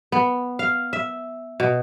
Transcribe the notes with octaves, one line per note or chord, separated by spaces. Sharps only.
B3
F5
E5
B2